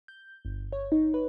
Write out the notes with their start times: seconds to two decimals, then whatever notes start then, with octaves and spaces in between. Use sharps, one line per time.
0.08 G6
0.45 G1
0.72 C#5
0.92 D#4
1.14 B4